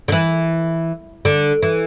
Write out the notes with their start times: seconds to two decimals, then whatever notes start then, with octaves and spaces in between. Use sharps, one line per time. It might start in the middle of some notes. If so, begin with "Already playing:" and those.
0.08 D3
0.12 E3
1.25 D3
1.62 E3